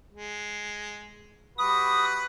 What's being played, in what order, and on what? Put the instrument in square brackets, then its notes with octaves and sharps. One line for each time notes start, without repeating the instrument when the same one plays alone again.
[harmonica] G#3
[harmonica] G3 F#4 B4 [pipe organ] D#6